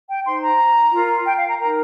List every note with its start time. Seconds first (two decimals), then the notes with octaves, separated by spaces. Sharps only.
0.08 G5
0.26 D#4 C5 C6
0.42 A#5
0.92 F4 A#4
1.26 G5
1.37 F5
1.48 A#5
1.59 D#4 A#4 A#5